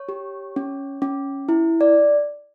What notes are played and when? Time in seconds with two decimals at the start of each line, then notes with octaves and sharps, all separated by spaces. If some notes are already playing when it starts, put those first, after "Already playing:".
Already playing: C#5
0.09 G4
0.56 C#4
1.02 C#4
1.49 E4
1.81 D5